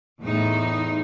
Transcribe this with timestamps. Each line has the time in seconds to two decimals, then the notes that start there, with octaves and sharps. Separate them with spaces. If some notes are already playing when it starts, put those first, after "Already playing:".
0.23 E2 A2 D#4